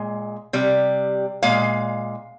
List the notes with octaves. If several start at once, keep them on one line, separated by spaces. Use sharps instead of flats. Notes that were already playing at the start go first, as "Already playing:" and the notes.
Already playing: A#2 G#3
C3 G3
A#2 G#3 F5